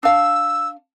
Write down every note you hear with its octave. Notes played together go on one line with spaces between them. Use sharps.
D4 F5 E6